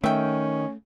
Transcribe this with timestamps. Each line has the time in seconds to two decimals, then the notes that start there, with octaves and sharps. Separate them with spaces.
0.04 D#3 A3 C#4 E5 G5